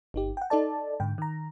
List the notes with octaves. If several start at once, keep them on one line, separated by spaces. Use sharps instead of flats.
G1 D#4 G4
F#5 G5
D#4 A4 D5 A5
G#2 D3 G5
D#3 A#5